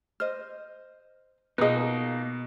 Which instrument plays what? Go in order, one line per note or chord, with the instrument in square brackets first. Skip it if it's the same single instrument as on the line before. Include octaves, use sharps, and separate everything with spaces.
[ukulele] C5 D#5 [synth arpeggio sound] F6
[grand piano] B2 [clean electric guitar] A#3 D#4 [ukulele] F4 D#5 [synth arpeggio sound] G#4 B4